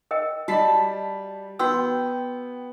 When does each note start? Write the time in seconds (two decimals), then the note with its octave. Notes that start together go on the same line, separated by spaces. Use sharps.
0.11 A#4 D#5 G5
0.48 G3 F#4 D#5 A5 B6
1.59 B3 F#4 G5 C6 E6